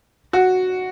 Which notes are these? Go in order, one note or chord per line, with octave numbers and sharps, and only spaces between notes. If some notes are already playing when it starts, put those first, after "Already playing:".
F#4